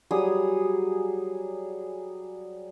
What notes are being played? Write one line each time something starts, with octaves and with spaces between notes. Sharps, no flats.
F#3 G3 G#4 D#6